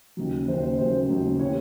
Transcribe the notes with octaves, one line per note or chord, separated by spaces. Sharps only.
D#2 C#3 F#3
D#2 C#3 F#3 C5
C5
D#2 C#3 F#3 C5
D#2 C#3 F#3
C3 E3 C#5